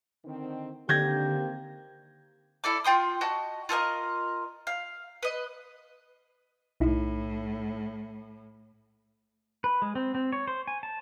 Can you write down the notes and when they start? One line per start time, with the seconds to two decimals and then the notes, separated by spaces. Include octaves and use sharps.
0.25 D3 D#3 C4
0.89 D3 D#3 A#3 C4 G4 G6 G#6 A#6
2.64 E4 A4 D5 D6
2.84 F4 G5 C6 D#6
3.21 F#4 D#5 A5
3.69 F4 A4 A#4 D#5
4.67 F5
5.23 B4 D#5
6.80 B1 A2 D#4 E4
9.64 B4
9.82 G#3
9.95 C4
10.15 C4
10.33 C#5
10.48 C5
10.68 G#5
10.83 A5